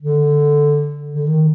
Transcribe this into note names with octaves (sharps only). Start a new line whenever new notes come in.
D3
D3
D#3